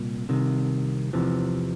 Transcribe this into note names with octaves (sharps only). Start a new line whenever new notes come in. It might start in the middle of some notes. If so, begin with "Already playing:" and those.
Already playing: C2 A#2
C2 C3 D#3
E2 C3 E3 F3